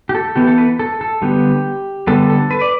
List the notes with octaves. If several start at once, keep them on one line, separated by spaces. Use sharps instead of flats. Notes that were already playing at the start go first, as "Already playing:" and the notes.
G4
A4
E3 B3 G4
A4
B4
A4
A4
D3 G3 B3 G4
D3 G3 B3 A4
A4
B4
D5